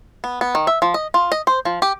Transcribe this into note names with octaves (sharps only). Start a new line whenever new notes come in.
B3
B3
D#3
E5
F3
D#5
F4
D#5
C5
F3
G4